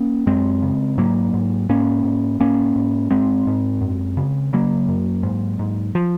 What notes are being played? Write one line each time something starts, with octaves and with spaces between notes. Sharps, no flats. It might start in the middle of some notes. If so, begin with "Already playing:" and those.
Already playing: A#3 C#4
F#2 G#3 C4
C#3
G#2 F#3 A#3
G#2
G#2 A#3 C#4
G#2
G#2 A#3 C#4
G#2
G#2 G#3 C4
G#2
F#2
C#3
C#3 F#3 A#3
F#2
G#2
G#2
F3